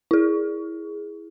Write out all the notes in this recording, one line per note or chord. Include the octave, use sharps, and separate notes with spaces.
E4 G#4